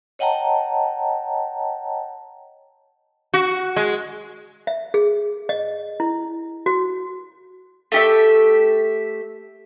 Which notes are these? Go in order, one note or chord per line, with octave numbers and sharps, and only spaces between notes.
C#5 D#5 F#5 G5 A5 A#5
F#4
G#3
E5
G#4
D#5
E4
F#4
A3 G4 E5